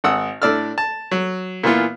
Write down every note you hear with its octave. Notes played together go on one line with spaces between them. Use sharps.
G#1 F#5 D#6 E6
A2 D4 D5 E6 F6
A5
F#3
A#2 E3 B3 F4